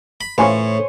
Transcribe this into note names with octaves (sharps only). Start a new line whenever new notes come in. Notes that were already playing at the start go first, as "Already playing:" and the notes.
B5
A2 E3 C#4 F4 C5 C#5 G#5